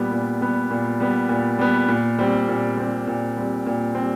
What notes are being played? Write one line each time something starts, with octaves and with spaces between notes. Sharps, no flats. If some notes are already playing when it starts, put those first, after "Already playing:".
Already playing: A#2 G3 B3
A#2
G3 B3
A#2
G3 B3
A#2
G3 B3
A#2
G3 C4
A#2
G3 C4
A#2
G3 C4
A#2
G3 C4